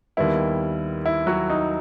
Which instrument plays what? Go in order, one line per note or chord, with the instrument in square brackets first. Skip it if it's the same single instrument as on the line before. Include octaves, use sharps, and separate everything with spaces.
[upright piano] D#2 D#3 G3 B3 [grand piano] E4
[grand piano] E4
F#3 F#4
D#4